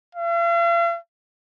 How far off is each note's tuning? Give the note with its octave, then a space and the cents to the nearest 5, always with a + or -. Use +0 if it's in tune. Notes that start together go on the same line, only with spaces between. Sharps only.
F5 -45